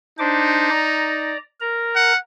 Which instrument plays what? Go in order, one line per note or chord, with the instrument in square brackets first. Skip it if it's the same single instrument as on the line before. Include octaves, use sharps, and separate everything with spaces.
[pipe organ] D4 C5 D6 [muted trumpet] D#4
[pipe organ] D5 A#5
A#4 A#5
[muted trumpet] F#5